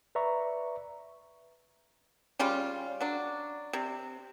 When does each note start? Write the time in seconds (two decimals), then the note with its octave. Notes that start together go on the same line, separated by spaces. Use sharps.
0.15 B4 D5 E5 A#5 C#6
2.39 C#3 G3 C#4 F4
3.01 F#3 D4
3.73 C3